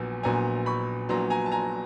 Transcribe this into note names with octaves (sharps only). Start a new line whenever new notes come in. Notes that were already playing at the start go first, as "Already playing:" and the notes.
Already playing: A#1 A#2 F#3 B3 G#5
A#1 A#2 F#3 B3 G#5 A#5
B5 C#6
A#1 A#2 F#3 B3 A#5 C6
G#5 A#5
A5
G#5 A#5